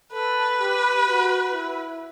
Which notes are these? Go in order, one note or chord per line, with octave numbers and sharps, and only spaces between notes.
A4 B4
G4
F#4
E4